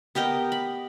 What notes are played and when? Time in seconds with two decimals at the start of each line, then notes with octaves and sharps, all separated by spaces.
0.15 B3 G4 A#4 D#5
0.52 B5